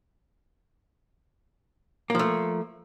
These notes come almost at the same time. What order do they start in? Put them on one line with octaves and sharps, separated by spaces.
A#3 F3 A3